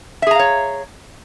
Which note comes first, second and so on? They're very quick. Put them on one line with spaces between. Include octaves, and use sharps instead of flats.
E5 G#4 A#5 F5 C#5